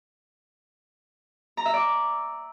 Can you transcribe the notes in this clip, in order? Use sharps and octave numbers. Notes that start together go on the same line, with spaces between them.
A#5
E5
D5